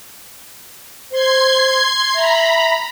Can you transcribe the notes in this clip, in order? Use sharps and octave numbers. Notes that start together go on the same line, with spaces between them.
C5 C6 G#6 C7
E5 A#5 B5